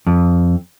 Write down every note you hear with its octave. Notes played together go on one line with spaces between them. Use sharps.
F2